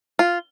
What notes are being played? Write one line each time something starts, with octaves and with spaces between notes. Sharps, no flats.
F4